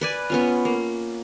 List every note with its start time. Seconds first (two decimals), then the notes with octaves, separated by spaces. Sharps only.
0.01 B4 D5 G#5
0.30 B3 C#4 F4
0.65 A#3